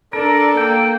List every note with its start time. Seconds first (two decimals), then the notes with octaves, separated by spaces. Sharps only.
0.13 D4 A4 A#4
0.57 A#3 G5